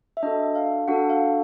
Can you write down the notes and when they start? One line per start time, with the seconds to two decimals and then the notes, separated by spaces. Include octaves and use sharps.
0.17 E5
0.23 D4 F#4 A4 D#5
0.40 E5
0.55 F5
0.88 D4 F#4 A4 F#5
1.10 F5